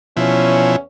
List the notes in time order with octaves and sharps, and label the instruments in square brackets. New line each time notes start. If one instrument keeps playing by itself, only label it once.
[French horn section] E2 C#4 [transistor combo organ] B2 F3 E4